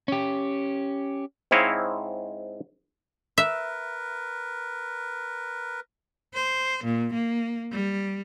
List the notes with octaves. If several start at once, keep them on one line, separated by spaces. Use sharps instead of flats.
C#4 G4
G#2 C4 E4 C#5 D#5 F5
A#4 B4 E5
C5
A#2
A#3
G3